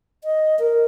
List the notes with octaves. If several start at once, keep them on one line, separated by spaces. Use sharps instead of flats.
D#5
A#4